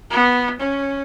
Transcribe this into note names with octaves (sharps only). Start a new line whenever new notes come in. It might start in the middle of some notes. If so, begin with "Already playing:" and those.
B3
C#4